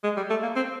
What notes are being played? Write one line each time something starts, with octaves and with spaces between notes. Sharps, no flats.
G#3
G3
A3
A#3
C4